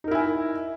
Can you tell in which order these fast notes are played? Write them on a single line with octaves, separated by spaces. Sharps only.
D#4 A#4 E4 G#5